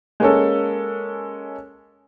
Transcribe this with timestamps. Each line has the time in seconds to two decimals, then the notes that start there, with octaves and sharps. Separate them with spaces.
0.20 G#3 A#3 C#4 A4